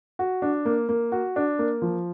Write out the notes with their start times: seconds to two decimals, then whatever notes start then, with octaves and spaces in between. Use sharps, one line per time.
0.19 F#4
0.42 D4
0.65 A#3
0.89 A#3
1.12 F#4
1.36 D4
1.59 A#3
1.82 F3